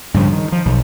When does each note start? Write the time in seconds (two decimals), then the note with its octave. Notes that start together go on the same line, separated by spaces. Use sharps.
0.14 G2 C#3 F3
0.32 D#3
0.52 F3
0.65 B1